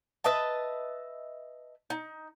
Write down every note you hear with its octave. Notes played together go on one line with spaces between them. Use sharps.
B4 D#5 E5 A5
D#4